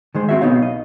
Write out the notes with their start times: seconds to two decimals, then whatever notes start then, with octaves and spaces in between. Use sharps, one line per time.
0.15 D#3 G#3 C5
0.29 C4 F#4 E5
0.41 B1 B3 D#4 C#5 F5
0.63 D#5